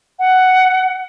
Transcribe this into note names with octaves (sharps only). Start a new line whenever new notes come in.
F#5